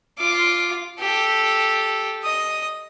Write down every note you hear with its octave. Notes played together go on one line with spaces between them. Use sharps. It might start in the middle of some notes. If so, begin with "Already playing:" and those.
F4 D6
G4 A4
D#5 D#6